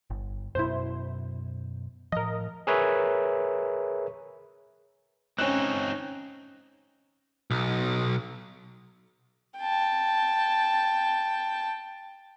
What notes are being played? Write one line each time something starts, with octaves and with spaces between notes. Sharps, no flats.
G1
F#2 B2 E4 C5
A2 F3 A#4 D#5
G#4 A#4 B4 C#5 E5
C4 C#4 D#4 F#6
B1
G5 A5